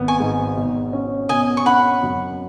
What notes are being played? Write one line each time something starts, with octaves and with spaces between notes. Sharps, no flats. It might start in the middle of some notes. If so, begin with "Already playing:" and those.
Already playing: G#1 B3
G#5 C#6
G#2
B2
C#4
B2 D#5 G#5
C#6
C#4 F#5 B5
F#2